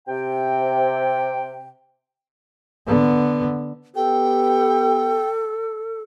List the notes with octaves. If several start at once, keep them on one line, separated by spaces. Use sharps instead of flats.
C3 G5
D3 B3
B3 G4 A4 G5